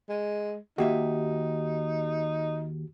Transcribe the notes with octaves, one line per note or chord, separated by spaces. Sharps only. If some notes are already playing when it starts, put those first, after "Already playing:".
G#3
D#2 A#3 D#4 F#4 G4 E5